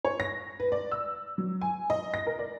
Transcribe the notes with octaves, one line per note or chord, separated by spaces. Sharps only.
C#5
A#6
B4
D5
E6
F#3
G#5
D#5
A#6
A#4
D5